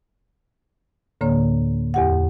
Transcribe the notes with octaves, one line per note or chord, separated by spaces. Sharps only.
D2 A2 D3 A#3 C#5
E2 G4 F#5